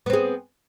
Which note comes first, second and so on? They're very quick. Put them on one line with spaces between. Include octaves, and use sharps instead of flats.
B3 C4 G#4